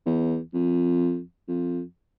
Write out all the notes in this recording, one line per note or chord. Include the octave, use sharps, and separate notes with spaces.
E2
F2
F2